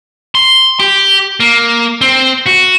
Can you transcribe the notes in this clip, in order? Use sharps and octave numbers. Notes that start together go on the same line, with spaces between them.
C6
G4
A#3
C4
F#4